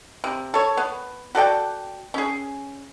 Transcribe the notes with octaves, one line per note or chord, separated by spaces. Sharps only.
C3
A4 C#5
B3
F#4 A4 D5 G5
C#4 G#4